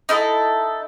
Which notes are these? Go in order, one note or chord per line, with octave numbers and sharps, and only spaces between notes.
D#4 E4 A4